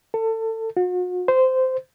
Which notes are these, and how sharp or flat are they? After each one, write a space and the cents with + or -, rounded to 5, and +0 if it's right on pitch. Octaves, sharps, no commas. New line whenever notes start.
A4 +25
F#4 -40
C5 -15